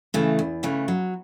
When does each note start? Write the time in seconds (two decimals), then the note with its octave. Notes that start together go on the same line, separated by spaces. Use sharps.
0.14 C#3 E3 A3
0.39 E2
0.63 C#3 E3 A3
0.88 F#3